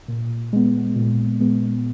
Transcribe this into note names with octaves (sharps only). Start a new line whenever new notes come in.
A#2
G#3 B3
A#2
G#3 B3